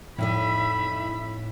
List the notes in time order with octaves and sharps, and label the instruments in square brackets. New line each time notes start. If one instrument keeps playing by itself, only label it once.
[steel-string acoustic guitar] F2 D#4 D#5 [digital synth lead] A2 [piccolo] E5 [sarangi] B5